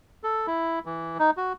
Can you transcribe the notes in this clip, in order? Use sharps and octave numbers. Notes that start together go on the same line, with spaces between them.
A4
E4
E3
D#4
F#4